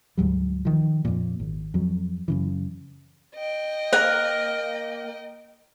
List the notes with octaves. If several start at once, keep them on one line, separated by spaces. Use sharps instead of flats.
D2 G#2 F#3 G3
D#3 F3
F2 A#2
G#1
F2 F#3
F#2 C#3 E3
D#5 G5
A#3 A#4 C5